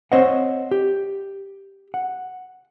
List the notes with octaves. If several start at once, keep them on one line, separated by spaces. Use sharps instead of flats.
C4 C5 C#5 D#5 F#5
G4
F#5